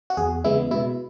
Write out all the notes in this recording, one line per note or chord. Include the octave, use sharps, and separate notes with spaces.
F#4
E2 G#4
C#3 E3 G#3 B3 E4
B2 E4